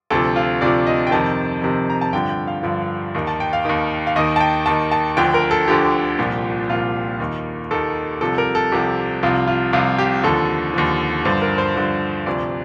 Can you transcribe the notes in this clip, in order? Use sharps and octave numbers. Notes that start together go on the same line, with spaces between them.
D2 C3 F3 A4
F4
D2 C3 F3 D5
D#5
G5
F2 C3 D#3 A5
F2 C3 D#3
A#5
A5
G2 D3 F3 G5
G5
F5
G2 D3 F3
D#2 D#3
A5
G5
F5
D#2 D#3
F5
D#2 D#3 D#5
A5
G5
D#2 D#3 A5
A5
D2 D3 F3 G5
A#4
A4
D2 D3 F3 G4
C2 A#2 F3
C2 A#2 F3 F4
D#2 D#3
D#2 D#3 A4
C2 C3 F3 A4
A#4
A4
C2 C3 F3 G4
C2 C3 F3 F4
F4
C2 C3 F3 F4
G4
D#2 D3 F3 A4
D#2 D3 F3
G2 D3 F3 C5
A#4
C5
G2 D3 F3
D2 C3 F3 D5